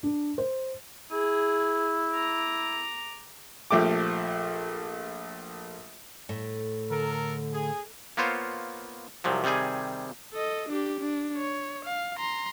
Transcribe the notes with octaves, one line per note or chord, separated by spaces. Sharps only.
D4
C5
E4 G#4
A#5 D6
A#1 F3 A3 G4 D6
A2
D3 A4 A#4
G#4
A#3 B3 F4 C5 C#5
C2 C3 F3 F#3
C3 D#3 G3 G#4 G#5
A4 D#5
D4 G4
D4
C#5
F5
A#5 C6